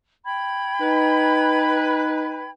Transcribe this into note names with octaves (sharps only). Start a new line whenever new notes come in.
G5 B5 G#6
D#4 B4